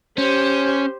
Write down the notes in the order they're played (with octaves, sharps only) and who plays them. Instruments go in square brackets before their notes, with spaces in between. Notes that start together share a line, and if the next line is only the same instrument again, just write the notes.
[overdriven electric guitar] C#4 [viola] G4 C5